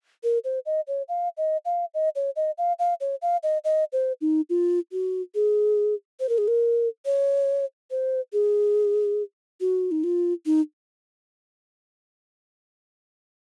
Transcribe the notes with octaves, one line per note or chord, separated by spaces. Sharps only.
A#4
C5
D#5
C#5
F5
D#5
F5
D#5
C#5
D#5
F5
F5
C#5
F5
D#5
D#5
C5
D#4
F4
F#4
G#4
C5
A#4
G#4
A#4
C#5
C5
G#4
F#4
D#4
F4
D#4